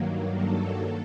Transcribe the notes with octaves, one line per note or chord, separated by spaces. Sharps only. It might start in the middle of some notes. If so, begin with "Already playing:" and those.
Already playing: G2 D#3 F#3 A#3
A4